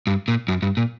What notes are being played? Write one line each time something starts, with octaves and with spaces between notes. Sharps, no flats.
G2
A#2
F#2
G2
A#2